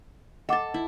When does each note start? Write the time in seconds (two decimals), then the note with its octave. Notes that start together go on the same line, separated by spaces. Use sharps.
0.49 A4 D#5 F#5 A5 D6
0.74 E4